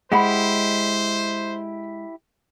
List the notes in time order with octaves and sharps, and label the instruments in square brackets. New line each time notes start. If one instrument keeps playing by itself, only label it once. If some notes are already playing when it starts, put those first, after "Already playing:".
[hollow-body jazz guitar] G#3 [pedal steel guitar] E4 G4 [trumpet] C5 [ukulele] D#5 F#5 B5